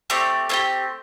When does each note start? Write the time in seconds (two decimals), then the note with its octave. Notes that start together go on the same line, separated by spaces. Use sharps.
0.10 A3 C4 G4 D5
0.49 A3 C4 E4 G4